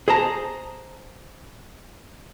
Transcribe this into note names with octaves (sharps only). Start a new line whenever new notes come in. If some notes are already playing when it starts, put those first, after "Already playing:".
G#4 C5 A5 A#5